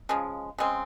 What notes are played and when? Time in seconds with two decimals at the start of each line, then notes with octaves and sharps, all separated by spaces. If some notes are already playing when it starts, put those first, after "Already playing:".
0.09 C#3 F3 G#3
0.58 C#3 G#3 C4